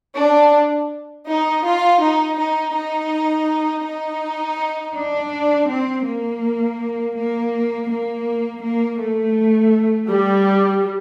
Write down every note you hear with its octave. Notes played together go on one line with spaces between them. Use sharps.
D4
D#4
F4
D#4
D#4
D#4
D#4
D4
C4
A#3
A#3
A#3
A#3
A3
G3